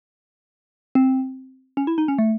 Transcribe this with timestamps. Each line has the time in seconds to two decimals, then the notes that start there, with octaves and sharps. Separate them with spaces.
0.95 C4
1.77 C#4
1.87 E4
1.98 D#4
2.08 C#4
2.18 A3